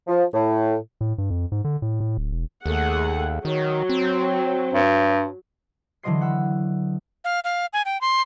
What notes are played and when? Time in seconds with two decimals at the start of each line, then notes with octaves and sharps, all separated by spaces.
0.08 F3
0.34 A2
1.01 A2
1.18 G2
1.30 F2
1.52 G#2
1.64 D3
1.82 A2
2.00 A2
2.17 D1
2.31 E1
2.66 D#2 A3 G#4 F#5
3.45 D#3 F#3
3.89 C4
4.73 G2
6.03 D3 E3 F#3 D#5 C6 C7
6.21 F#5 B5 E6
7.25 F5
7.44 F5
7.73 G#5
7.85 G5
8.01 C6